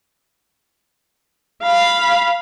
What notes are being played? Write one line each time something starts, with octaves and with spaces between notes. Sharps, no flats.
F5 B5